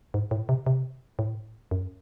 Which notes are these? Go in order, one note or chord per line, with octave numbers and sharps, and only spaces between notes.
G#2
A2
C3
C3
A2
F#2